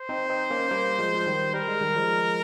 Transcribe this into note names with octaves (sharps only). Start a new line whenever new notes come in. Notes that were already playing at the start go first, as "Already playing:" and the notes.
Already playing: C5
C4 D#4
C4 D#4
A#3 C#4
G3 A#3
F3 G#3
F3
D#3 G3
G3 A#4
G#3
D#3 G3
F3 G#3